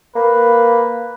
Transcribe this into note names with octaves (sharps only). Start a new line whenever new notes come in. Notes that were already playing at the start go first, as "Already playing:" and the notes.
A#3 B4